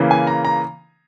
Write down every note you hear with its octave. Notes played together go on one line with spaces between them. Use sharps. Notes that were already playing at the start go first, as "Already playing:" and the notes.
Already playing: C#3 E3 A#3
G#5
A#5
A#5